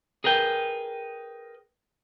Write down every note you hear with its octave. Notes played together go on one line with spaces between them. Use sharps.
G#4 A#4 B4 G5